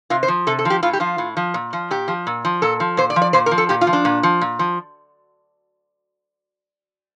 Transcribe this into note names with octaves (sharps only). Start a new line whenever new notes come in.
C3 F4
C5
F3
C3 A4
A4
F3
G4
A2 F4
G4
F3 F4
A2
F3
A#2
F3
A#2 G4
F3
A#2
F3
A#2 A4
F3
A#2 C5
D5
F3
D5
A#2 C5
A#4
F3
A4
A#2 G4
F4
F3
D4
A#2
F3
A#2
F3